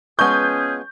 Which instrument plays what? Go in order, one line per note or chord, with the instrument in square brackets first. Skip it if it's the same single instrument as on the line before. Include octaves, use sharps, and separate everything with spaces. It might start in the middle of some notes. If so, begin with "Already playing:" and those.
[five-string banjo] F3 G#3 B3 [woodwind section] C#4 G#4 [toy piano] C#6 [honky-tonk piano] G6